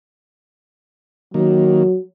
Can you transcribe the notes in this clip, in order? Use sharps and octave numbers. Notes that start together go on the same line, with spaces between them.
D#3 F#3 A#3